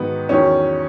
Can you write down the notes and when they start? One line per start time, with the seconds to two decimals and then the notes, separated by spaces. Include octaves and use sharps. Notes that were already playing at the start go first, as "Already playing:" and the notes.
Already playing: G#2 D#3 F#3 B3
0.29 E2 D#3 F#3 C#4